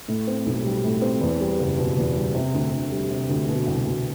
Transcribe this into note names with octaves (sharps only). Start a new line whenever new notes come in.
A2
C4
B1
G3
A2
C4
E2
G3
F#1
B2
E2
G3
C3
D2
D2
G3
C3
D2
B2
C2
C2